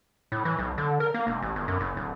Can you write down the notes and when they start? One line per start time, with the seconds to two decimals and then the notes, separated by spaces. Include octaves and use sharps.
0.32 A2
0.45 E3
0.59 B1
0.78 D3
1.00 A#4
1.14 A#3
1.27 E1
1.42 A1
1.56 G1
1.68 F#2
1.80 F#1
1.96 D1